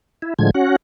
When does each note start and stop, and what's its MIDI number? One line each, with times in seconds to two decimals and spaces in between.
0.22 0.34 64
0.39 0.50 45
0.39 0.50 50
0.39 0.50 53
0.39 0.50 56
0.39 0.50 92
0.54 0.76 61
0.54 0.76 66
0.54 0.76 78